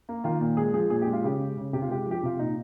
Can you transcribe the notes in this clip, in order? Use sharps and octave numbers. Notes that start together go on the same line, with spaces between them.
A#3
D#3 F4
A#2
G#3 G#4
F3 G#4
A#2 G#4
G4
G#3
F4
C#3 G4
G#3
C#3
C3 G4
F4
G#3 G4
F3
G4
C3 F4
A#2 D#4